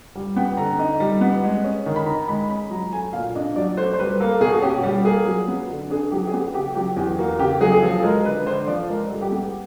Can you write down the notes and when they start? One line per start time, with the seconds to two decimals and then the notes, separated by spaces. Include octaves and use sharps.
0.15 G3
0.36 B3 G5
0.57 D3 A#5
0.79 D#4
1.00 G3
1.21 B3
1.44 G#3
1.64 C#4
1.86 D#3
1.96 B5
2.06 D#3 A#5
2.28 G#3 B5
2.49 C#4 B5
2.70 F#3 A#5
2.92 A3 G#5
3.13 A#2 F5
3.35 D4 D#5
3.56 F#3 D5
3.77 A3 C5
3.93 C5
3.99 G3 B4
4.20 A#3 A4
4.41 B2 G#4
4.54 F#4
4.62 C#4 G4
4.78 F#4
4.83 G3 G4
5.05 A#3 G#4
5.26 F#3
5.48 B3
5.70 D3
5.90 D4 G#4
6.11 F#3 G4
6.27 G#4
6.32 B3 G4
6.54 C#3 G4
6.75 F#3 G4
6.96 E2 G4
7.18 A#3 F#4
7.39 C#3 G4
7.60 F#3 G#4
7.72 G#4
7.82 F3 A4
8.03 G#3 A#4
8.25 D3 B4
8.47 D3 C5
8.67 F3 D5
8.88 G#3 A#4
9.10 G3 A4
9.21 G4
9.32 B3 G#4